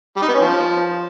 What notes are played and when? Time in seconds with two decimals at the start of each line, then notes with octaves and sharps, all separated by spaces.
0.16 G3
0.22 D#4
0.28 B3
0.34 C#4
0.41 F3